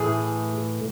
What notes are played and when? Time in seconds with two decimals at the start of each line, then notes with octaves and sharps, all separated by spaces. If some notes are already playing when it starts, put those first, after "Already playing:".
Already playing: A2 E3 A3 G#4